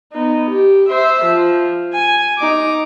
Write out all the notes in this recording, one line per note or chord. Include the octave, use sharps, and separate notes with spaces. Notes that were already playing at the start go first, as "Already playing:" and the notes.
B3 D#4
G4
C5 E5
F3
G#5
D#4 D6